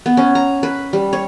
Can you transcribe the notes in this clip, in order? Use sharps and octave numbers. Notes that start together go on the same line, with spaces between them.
B3
C#4
A#5
B4
G3
C#5